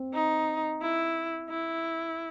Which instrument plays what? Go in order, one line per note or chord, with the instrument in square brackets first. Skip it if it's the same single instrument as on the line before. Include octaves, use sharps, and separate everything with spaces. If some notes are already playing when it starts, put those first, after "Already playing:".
Already playing: [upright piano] C4
[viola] D#4
E4
E4